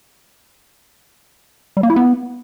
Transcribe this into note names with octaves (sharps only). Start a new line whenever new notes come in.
G3
A#3
E4
B3